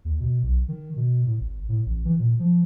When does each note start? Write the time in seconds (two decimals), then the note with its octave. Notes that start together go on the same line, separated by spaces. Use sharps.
0.05 D#2
0.20 B2
0.43 B1
0.68 D#3
0.96 B2
1.26 A2
1.40 G#1
1.69 A2
1.86 A1
2.05 E3
2.19 A#2
2.39 F3